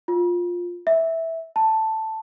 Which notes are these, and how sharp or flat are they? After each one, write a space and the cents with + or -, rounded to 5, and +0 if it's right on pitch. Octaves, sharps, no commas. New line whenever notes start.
F4 +10
E5 -10
A5 +5